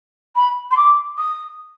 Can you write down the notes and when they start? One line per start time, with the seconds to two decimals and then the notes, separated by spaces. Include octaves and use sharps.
0.35 B5
0.70 C6
0.76 D6
1.17 D#6